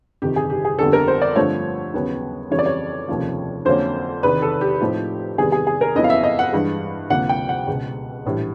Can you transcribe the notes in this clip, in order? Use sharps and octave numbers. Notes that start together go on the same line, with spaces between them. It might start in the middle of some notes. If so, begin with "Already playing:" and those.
G1 F2 C3 D#3 G4
G#4
G4
G#4
G1 F2 D3 G3 B3 A4
A#4
C5
D5
G2 D3 F3 A3 C4 C#5
D#2 C#3 F#3 B3
F2 C#3 E3 G3 C#5
D5
C#5
F1 D#2 C#3 F3 A#3
F2 D3 F#3 A#3 C#4 C5
E2 C3 D#3 B4
A4
G4
A2 F3 A3 C4 D#4
E2 C3 D#3 G3 B3 G#4
G#4
G#4
A#4
F2 C#3 F#3 B3 E4 D#5
F5
E5
D#5
F#5
G2 E3 G#3
D2 C3 F3 A#3 F#5
G5
F#5
C#2 B2 G#3
A#1 A2 E3 G3